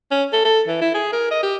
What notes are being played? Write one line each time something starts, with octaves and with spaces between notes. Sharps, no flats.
C#4
A4
A4
E3
E4
G#4
A#4
D#5
G4